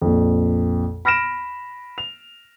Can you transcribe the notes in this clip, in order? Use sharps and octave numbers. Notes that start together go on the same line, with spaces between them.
A#1 F2
B5 F6 A#6 D7 E7
F7